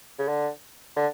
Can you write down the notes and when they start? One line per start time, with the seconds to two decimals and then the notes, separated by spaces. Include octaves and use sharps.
0.18 C#3
0.27 D3
0.96 D3